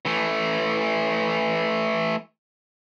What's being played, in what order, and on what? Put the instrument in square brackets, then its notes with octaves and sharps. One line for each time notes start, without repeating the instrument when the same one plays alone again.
[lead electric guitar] E3 A3